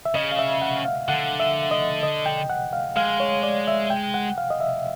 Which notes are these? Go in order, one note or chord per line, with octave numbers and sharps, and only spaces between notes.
E5
C#3 D#5
F5
E5
F#5
F5
D3 F#5
E5
D#5
D#5
G5
F#5
F5
G#3 F5
C#5
D5
E5
G5
F#5
F5
D#5
E5